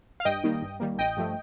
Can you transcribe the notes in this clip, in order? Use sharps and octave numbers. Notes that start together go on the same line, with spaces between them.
F5
G2 D#5 G5
D#3 G3 A#3
G2
D#3 G3 A#3
A1 D#5 G5
G2 F3 A3